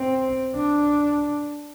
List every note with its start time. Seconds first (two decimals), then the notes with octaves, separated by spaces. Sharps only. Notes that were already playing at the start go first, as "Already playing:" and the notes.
Already playing: C4
0.55 D4